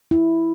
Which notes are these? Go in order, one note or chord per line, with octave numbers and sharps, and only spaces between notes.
E4